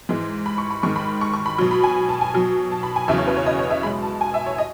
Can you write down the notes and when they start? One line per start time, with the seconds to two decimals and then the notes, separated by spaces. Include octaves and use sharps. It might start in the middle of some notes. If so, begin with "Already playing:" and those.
0.09 G#2 E3 G#3
0.46 B5
0.58 C#6
0.71 B5
0.83 G#2 D#3 G#3 C#6
0.96 B5
1.21 C#6
1.34 C#6
1.46 B5
1.58 B2 F#3
1.71 B5
1.84 G#5
2.09 A5
2.21 G#5
2.34 B2 F#3
2.72 A5
2.83 B5
2.96 G#5
3.08 E2 C#3 F#3 E5
3.18 C#5
3.27 B4
3.36 C#5
3.46 D#5
3.59 C#5
3.70 E5
3.83 B2 G#3 B5
4.02 A5
4.21 G#5
4.34 E5
4.46 C#5
4.58 D#5